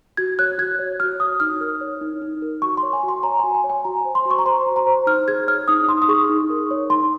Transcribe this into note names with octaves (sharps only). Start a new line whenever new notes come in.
F#4 G#6
C#5 F#6
F#4 G#6
C#5
F#4 F6
C#5 D#6
D#4 F6
A#4
C#5
D#4
D#4
A#4
F#4 C#6
C6
C#5
G#5
F#4
C6
C#5 A#5
G#5
F#4
G#5
C#5
G#5
F#4 A#5
A#5
C5
C6
F#4
C#6
A#5
C5 C6
F#4
A#5
C5
D#4 F6
G#4 G#6
C#5 F6
D#4 D#6
D#4 C6
D#6
G#4 C#6
D#4
A#4
C#5
D#4 C6